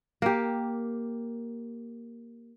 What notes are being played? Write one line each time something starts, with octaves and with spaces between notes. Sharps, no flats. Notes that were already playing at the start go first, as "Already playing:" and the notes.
A#3 G4